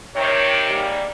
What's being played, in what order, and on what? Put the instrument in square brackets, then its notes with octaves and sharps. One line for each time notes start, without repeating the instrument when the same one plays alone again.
[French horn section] C3 D#3 [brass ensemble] C#5
[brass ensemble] G#2 G3 A#3